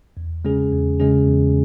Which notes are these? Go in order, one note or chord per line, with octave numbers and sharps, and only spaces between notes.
E2
C#3 G#3 C#4 G#4
E2
C#3 G#3 C#4 G#4
E2